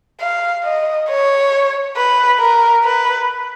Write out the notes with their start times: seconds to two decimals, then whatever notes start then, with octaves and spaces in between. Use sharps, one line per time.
0.21 F5
0.65 D#5
1.09 C#5
1.97 B4
2.40 A#4
2.84 B4